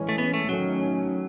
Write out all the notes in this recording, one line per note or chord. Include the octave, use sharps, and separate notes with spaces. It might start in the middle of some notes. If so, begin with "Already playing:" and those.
Already playing: E3 G#3 C#4
A3
B3
A3
D#3 F#3 A3 C#4